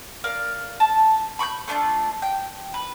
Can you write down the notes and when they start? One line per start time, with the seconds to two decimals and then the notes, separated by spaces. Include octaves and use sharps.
0.24 A#4 D5 F5
0.80 A5
1.39 B5 C#6 D6 G6
1.68 A3 D4 E4 F4
2.22 G5
2.74 B4